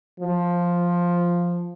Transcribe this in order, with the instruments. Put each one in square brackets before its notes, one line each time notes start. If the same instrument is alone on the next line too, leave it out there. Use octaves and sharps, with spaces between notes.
[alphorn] F3